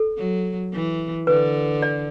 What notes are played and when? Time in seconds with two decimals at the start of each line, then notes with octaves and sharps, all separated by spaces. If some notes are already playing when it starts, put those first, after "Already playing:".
Already playing: A4
0.17 F#3
0.73 E3
1.27 D3 B4
1.82 D5